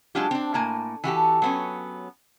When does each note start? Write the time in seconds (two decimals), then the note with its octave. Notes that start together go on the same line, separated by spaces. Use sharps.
0.15 F#3 G#3 D4 F4 G4
0.31 C4 D4
0.54 A2 A#3 G#5
1.04 E3 F#4 G4 A4
1.42 F#3 B3 C#4